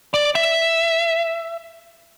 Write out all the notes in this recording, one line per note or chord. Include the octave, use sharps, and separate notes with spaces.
D5
E5